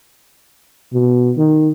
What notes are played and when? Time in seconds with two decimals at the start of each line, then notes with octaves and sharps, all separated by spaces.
0.93 B2
1.37 D#3